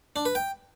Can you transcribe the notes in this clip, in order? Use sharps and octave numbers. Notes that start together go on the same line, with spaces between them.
D4
B4
G5